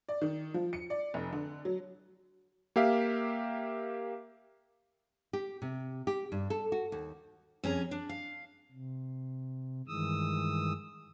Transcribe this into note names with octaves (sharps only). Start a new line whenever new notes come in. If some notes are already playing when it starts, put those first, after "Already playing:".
D5
D#3
F3
C#7
D5
F1
D3
F#3
A#3 G4 E5 F5
G4
C3
G4
G2
A4
F#4
D#2
F2 C#4 G#4 A#5
D4
F5
C3
G2 D#3 E3 G#3 D#6 E6